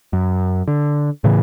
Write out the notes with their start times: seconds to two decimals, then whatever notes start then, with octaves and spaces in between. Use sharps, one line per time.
0.13 F#2
0.68 D3
1.24 A2 C#3 E3